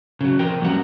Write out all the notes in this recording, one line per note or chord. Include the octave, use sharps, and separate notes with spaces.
C#3 F#3
C3 F3 A#4 G5
F2 F#3 G3 A#3 C#4 F#5